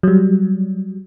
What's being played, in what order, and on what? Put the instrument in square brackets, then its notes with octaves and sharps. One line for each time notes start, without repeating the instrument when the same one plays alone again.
[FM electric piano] F#3 G3